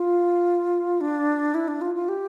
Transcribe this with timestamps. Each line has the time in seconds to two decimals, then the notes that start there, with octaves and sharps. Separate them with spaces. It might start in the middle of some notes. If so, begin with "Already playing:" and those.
Already playing: F4
1.01 D4
1.55 E4
1.68 D4
1.81 F4
1.95 F4
2.09 G4